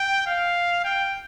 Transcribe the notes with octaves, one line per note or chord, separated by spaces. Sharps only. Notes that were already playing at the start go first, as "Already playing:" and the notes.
Already playing: G5
F5
G5